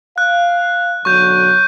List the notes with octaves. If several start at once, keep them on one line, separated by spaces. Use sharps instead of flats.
F5 F#6
B1 D3 F#3 C#6 G6